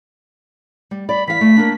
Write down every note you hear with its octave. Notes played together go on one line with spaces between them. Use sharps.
G3
D5 B5
E3 F5 B6
A3
A#3 D4